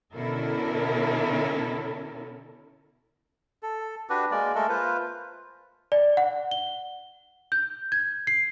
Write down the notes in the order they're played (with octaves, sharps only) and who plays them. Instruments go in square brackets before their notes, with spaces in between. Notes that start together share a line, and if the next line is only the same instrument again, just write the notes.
[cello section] B2 D3 C#4 E4 A4 A#4
[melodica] A4
D4 F#4 G4 B4
G#3 A#3 D5
G#3 A3 A4 A#4
A#3 F4 B4 C5
[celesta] D5
F#5
G7
G6
G#6
C7